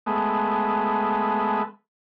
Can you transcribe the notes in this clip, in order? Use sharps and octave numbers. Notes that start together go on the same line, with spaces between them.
G#3 A3 B3